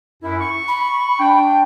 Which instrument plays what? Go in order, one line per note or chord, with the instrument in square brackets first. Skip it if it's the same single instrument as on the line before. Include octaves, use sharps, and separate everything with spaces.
[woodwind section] F#2 E4
C#6
[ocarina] B5
[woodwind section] D4 G5